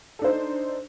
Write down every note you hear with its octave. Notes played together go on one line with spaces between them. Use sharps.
D4 D#4 A4 C5